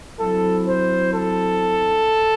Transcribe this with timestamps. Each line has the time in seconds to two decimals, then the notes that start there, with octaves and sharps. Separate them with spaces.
0.20 F#3 C4 E4 A4
0.67 C5
1.14 A4